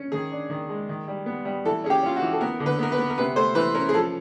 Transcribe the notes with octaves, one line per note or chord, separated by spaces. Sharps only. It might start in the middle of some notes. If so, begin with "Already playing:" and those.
Already playing: C#4
D#3 G#4
D4
D#3
G#3
D#3
G3
B3
G3
E3 A4
C#4 G#4
G4
C#4 F4
F#4
E3
A4
B3 A#4
D3
B4
B3 A#4
B4
B3
A#4
C3 B4
A3 C5
E3 B4
C#4 A#4
G#4
F3 A4